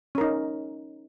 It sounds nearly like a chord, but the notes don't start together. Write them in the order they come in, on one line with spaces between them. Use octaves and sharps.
C#4 A#4 D#4